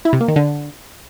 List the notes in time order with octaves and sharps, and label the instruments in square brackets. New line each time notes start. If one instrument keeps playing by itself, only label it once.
[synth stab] E4
C3
A#3
D#3
D3